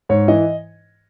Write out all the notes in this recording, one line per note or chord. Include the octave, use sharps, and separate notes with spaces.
G#2 C#5
E3 D#5